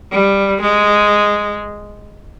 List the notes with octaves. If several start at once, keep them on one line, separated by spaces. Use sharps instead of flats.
G3
G#3